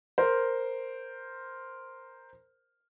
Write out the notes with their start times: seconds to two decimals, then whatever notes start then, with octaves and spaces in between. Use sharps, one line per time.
0.18 A#4 C5